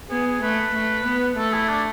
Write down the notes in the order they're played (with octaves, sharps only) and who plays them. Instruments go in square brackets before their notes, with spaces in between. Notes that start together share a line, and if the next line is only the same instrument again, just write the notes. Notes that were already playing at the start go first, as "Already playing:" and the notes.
[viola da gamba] B3 [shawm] G#4
[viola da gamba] A3 [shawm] B4
[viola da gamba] A3
B3
[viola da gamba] A3 [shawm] A4
[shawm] E4
D4